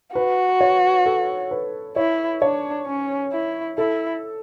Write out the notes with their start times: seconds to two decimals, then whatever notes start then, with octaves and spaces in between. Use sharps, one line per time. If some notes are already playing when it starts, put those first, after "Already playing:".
0.15 F#4 B4
0.61 C#5
1.06 A4
1.51 B4
1.96 E4 C#5
2.42 D4 C#5
2.87 C#4
3.33 E4
3.78 E4 A4